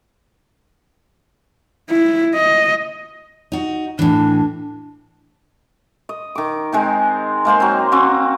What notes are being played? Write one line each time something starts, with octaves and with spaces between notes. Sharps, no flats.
E4
D#5
D#4 F#4
A2 E3 D4
D#5
D#3 D6
G#3 C4 D#4
G#3 A#3 C5 C6
F#3 C4
C4 C#4 F#4